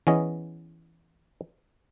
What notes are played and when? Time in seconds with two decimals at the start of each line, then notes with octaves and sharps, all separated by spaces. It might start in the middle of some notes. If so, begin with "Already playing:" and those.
0.07 E3 B3 C#4 G#4 D#5